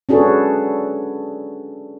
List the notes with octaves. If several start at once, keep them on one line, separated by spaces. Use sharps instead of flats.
C#4 D4 F#4 G#4 A4 B4